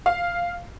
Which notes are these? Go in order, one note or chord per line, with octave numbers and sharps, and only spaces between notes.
F5